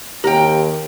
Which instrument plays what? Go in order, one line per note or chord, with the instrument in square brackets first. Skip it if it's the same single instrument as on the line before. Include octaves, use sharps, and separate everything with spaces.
[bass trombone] D#2 [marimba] G4 [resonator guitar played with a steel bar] A#4 G5